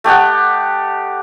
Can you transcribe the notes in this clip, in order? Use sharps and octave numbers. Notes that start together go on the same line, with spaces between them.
A3 G4 D#5 F#5